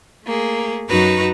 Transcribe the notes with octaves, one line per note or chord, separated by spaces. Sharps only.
A3 A#3 G#4
F#2 D#4 F#4 B4 A#5